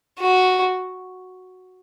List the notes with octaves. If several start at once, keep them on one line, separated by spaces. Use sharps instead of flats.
F#4